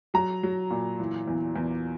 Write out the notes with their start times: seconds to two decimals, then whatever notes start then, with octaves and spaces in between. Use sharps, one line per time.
0.14 F#3 A#5
0.43 F#3
0.71 A#2
1.00 E3
1.27 E2
1.56 E2